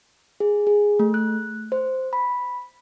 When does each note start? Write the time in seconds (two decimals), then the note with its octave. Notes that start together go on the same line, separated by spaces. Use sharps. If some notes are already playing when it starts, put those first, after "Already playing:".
0.40 G#4
0.67 G#4
0.99 A3
1.14 F#6
1.72 C5
2.13 B5